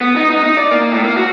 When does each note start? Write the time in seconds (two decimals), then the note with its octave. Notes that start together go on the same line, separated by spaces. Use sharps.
0.01 B3
0.16 D#4
0.30 D#4
0.43 D#4
0.57 D5
0.71 A#3
0.92 A2
1.04 A#3
1.16 F#4